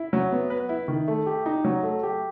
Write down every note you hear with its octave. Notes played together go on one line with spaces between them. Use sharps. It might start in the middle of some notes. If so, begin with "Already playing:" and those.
Already playing: E4
F#3
B3
B4
E4
D#3
A3
G4
D#4
F#3
A3
G4